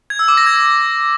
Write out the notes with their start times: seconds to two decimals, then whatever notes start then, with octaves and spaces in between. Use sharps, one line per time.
0.10 G#6
0.19 E6
0.28 D6
0.37 A#6
0.46 G#6